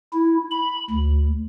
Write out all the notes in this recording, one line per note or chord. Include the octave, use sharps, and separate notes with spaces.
E4
B5
D2